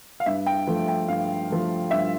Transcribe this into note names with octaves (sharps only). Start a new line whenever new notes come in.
F5
G2 E5
G5
F3 A3
G5
G2 F5
F3 A3
G2 E5